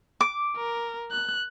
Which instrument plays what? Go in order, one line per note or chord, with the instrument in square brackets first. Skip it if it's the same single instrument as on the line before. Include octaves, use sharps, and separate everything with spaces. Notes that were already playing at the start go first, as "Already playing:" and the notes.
[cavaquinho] D6
[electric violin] A#4
F#6